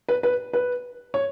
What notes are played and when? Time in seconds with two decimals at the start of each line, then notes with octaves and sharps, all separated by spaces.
0.09 B4
0.23 B4
0.53 B4
1.14 C#5